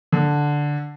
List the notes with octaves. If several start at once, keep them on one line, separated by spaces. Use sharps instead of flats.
D3